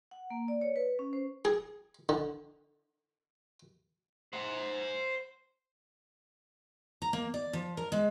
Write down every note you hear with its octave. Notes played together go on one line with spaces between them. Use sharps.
F#5
A#3
D5
C#5
B4
C#4
C5
G#4
D3
C5 F#5
A#5
A#3
D5
F3
A#4
G#3